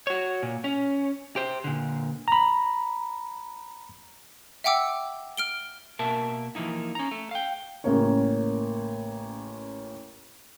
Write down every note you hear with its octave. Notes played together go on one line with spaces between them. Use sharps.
F#4 C#5
A#2
C#4
G4 C5
A#2 D3
A#5 B5
E5 F#5 G5 D6 E6
F6 D7 G7
B2 A#3 A#4 E5 A5
E3 F3 A#3 D#4 E4
C#4 A#5
A3
F5 G5
A1 C#3 A#3 A#4 C#5